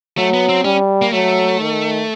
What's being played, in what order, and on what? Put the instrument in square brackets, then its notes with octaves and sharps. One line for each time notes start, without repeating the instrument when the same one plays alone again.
[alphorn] F#3 [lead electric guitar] A3
[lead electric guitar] B3
C4
[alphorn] G3 [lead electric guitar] C#4
[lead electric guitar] A#3
[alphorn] F#3 [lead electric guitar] A3
[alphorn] D#3